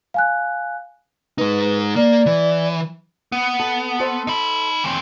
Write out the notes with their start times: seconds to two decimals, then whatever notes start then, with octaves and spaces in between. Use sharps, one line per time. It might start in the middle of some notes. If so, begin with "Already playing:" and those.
0.14 F5 G#5 F#6
1.38 G#3 D#4 B4
1.96 A#3 D5
2.26 E3
3.32 B3
3.59 A4
4.00 A4 C5 E5
4.27 D#4 B5
4.84 E3 C4